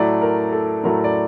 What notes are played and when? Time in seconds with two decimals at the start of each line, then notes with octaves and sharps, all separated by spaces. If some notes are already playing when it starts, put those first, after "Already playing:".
Already playing: A2 F#3 A3 D5
0.22 A#4
0.52 A4
0.83 A2 F#3 A3 A#4
1.04 D5